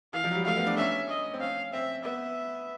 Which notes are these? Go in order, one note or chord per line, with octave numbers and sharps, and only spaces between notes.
E3 F5
F3
F#3
G3
A3 F5
B3
D4
C#4 E5
D#5
C4
C#4 F5
C4 E5
B3 E5